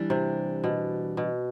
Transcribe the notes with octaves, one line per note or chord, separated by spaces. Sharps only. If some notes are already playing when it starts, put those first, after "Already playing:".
Already playing: E3 G3 D4
C3
B2
B2